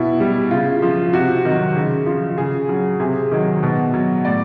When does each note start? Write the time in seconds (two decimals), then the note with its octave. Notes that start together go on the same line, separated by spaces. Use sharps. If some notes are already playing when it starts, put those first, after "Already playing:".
Already playing: B2 E4
0.20 G3
0.51 C#3 F4
0.82 F3
1.13 C3 F#4
1.45 D#3 F#3
1.76 C#3
2.06 F3
2.38 C#3 G#4
2.69 F#3
3.00 C3 G#4
3.31 D#3 F#3
3.63 B2
3.94 F#3
4.25 A2 D5